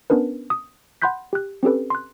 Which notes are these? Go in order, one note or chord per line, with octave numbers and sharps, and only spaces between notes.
B3 C#4 D4 A#4 B4
D#6
F#5 B5 C6 F#6 G6 B6
G4 F#6
C4 C#4 G4 A4 B4
C6 F#6